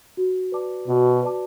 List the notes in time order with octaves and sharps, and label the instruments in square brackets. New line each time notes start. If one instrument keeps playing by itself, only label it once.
[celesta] F#4
B4 D5 A5 D6
[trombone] B2 [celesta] F#4
[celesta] B4 D5 A5 D6